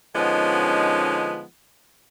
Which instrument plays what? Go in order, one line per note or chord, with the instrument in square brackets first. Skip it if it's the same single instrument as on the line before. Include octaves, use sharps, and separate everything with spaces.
[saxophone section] D3 F3 G#3 B3 C#4 D#4